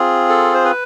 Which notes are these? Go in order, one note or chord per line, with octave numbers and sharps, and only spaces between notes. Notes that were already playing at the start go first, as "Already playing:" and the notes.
Already playing: C4 F4 G#4
A4
C5
B4